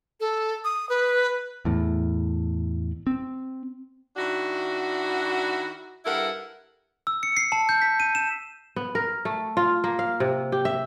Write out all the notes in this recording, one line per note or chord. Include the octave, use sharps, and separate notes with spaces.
A4
D#6
B4
E2 A2
C4
D#3 D4 E4 F#4
G2 E4 A4 A#4 F#5
E6
C#7
C7
A5
G6
B6
D#7
E7
B3
A#4
A3
F4
A#3
F5
C3
G4
E5